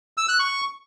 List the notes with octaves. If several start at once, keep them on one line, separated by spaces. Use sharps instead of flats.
E6
F#6
C#6